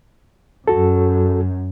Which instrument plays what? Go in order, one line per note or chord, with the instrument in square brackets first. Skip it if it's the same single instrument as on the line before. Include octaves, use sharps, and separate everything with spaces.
[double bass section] F#2 [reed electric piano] F#4 A4